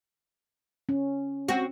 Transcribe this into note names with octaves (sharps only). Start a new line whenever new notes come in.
C#4
C4 F#4